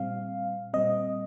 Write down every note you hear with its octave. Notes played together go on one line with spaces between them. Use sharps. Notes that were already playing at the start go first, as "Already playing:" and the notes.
Already playing: A#2 G3 C4 F5
A#2 G3 C4 D#5